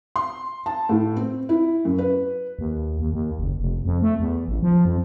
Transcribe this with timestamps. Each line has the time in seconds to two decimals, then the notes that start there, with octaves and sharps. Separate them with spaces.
0.16 C6
0.66 A5
0.89 A2
1.17 C4
1.49 E4
1.85 F#2
1.98 B4
2.59 D#2
2.99 D#2
3.13 D#2
3.39 F#1
3.60 F1
3.85 F2
4.02 A3
4.20 E2
4.48 A1
4.63 F3
4.85 F2